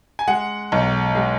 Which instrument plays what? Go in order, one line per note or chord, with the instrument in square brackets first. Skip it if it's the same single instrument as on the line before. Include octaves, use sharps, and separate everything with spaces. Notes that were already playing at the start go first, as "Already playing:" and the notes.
[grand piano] G#5
G#3 F#5
B1
G#3